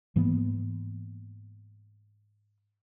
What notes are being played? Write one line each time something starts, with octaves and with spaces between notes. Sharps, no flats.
G#2 E3 A#3 B3